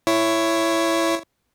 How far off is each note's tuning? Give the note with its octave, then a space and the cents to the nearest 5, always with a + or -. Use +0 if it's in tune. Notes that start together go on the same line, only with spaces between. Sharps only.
E4 +15 C#5 +0